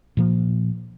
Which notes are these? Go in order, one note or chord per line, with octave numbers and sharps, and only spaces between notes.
A#2 F3 A#3